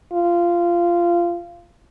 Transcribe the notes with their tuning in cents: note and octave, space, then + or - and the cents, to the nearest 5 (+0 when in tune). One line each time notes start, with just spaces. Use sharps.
F4 -15